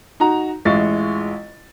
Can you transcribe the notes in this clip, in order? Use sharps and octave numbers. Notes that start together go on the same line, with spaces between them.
D#4 F#4 A#5
A1 G#3 E4 F4 C#6 A6